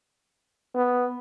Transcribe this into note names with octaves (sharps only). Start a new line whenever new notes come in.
B3